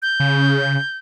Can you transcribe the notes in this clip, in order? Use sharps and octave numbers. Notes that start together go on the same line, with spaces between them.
G6
C#3